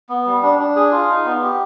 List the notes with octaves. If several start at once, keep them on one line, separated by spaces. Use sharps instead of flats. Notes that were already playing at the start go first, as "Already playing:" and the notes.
B3
G3
D4
D4
G#4
F4
D#4
B3
G4